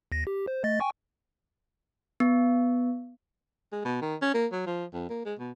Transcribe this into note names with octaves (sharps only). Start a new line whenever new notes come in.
D#2 A#6
G4
C5
A3 D#5 A6
G5 G#5 C#6
B3
G#3
B2
D#3
C#4
A#3
F#3
F3
F2
A#3
G#3
B2